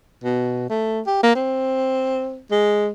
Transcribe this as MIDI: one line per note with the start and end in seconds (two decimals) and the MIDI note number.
0.24 0.68 47
0.69 1.01 57
1.06 1.20 67
1.23 1.35 58
1.35 2.41 60
2.51 2.89 56